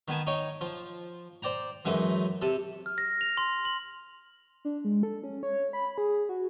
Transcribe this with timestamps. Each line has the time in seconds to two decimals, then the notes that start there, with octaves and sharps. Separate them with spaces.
0.08 D#3 B3 G#5 A5
0.27 D#4 C#5 G5
0.61 F3
1.42 C5 D5 G5 A#5
1.85 F#2 E3 G#3 A3 D#4
2.42 C3 A4
2.86 F6
2.98 A#6
3.21 F7
3.37 C6
3.65 F#7
4.65 D4
4.85 G#3
5.03 A4
5.24 C#4
5.43 C#5
5.73 B5
5.98 G#4
6.29 F#4